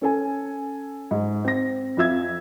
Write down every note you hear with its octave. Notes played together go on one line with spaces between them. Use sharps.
C#4 A4 G#5
G#2
C4 A#6
F2 F4 E5 E6 G#6